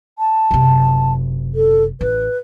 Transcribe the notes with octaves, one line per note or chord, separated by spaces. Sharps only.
A5
F#1 C3
A4
A1 B4